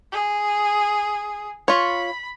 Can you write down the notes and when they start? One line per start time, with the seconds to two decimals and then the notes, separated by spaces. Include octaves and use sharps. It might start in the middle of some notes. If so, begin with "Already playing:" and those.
0.12 G#4
1.68 F4 C#5 B5